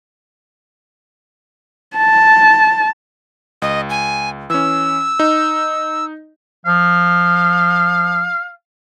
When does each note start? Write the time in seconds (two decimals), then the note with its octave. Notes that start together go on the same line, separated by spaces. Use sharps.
1.97 A5
3.62 C#2 D#5
3.90 G#5
4.50 E3 C#4 E6
5.19 D#4
6.65 F3 F5